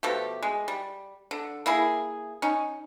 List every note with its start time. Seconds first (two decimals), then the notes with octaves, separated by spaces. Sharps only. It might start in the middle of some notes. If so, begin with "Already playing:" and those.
0.03 B2 F3 A3 G4
0.43 G#3
0.68 G3
1.31 D3
1.66 A#3 E4 G#4
2.42 C#4 D#4